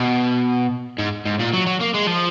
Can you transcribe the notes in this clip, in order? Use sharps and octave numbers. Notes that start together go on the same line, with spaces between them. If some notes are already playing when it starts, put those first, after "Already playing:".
Already playing: B2
G#2
G#2
A#2
F#3
F#3
A#3
G#3
F3